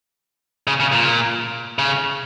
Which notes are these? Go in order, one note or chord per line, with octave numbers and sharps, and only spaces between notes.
C#3
C#3
A#2
C#3